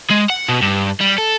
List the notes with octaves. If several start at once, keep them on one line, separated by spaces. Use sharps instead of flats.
G#3
F#5
B2
G2
G3
A4